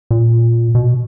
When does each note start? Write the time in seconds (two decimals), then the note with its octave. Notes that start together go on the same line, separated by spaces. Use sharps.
0.11 A#2
0.75 B2